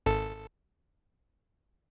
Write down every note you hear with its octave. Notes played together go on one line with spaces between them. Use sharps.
G#1 A4